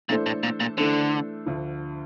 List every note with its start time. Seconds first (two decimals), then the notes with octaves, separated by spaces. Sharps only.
0.09 A#2 E3 A3 D4 A4 C5
0.26 A2
0.43 A#2
0.60 A#2
0.77 D3 E3 A3 D4 A4 C5
1.46 D2 D3 F3